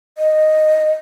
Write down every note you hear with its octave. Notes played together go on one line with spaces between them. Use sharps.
D#5